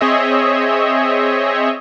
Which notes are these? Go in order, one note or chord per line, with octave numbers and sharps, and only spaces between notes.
C4 G#4 C#5 D#5 E5